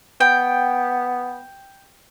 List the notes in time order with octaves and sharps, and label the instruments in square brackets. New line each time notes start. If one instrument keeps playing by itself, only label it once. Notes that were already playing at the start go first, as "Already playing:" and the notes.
[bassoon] B3 [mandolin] G5